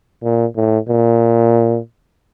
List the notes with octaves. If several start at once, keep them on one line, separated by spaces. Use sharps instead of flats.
A#2
A2
A#2